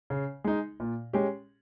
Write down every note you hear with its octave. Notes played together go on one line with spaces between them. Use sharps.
C#3
G#3 D#4
A#2
G#3 C#4 G4